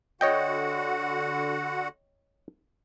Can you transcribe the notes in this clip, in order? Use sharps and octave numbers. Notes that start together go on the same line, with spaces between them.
D3 F#4 C#5 D#5 F#5 G5